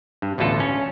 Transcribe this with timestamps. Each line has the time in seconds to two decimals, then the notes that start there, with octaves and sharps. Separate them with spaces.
0.22 G2
0.38 A1 D2 B2 F4 A4
0.60 C#4